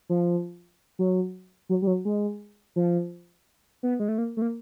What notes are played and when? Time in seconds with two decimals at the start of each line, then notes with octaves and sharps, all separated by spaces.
0.09 F3
0.99 F#3
1.69 F#3
1.82 G3
1.87 F#3
2.05 G#3
2.76 F3
3.83 B3
4.00 G#3
4.09 A3
4.18 A#3
4.37 A3
4.42 A#3